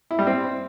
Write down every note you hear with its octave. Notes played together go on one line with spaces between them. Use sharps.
E4
G3
C4